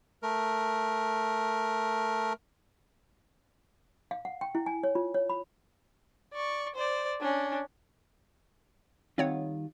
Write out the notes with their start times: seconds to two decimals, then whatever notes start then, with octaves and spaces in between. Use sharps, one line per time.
0.23 A3 A#4
4.11 F5
4.25 F#5
4.41 G5
4.55 E4
4.66 G#5
4.83 C#5
4.95 F4
5.14 C#5
5.30 B5
6.33 D5 C#6
6.75 C5 D5
7.21 C#4 D4
9.18 D#3 G3 C4 F4 C#5 F#5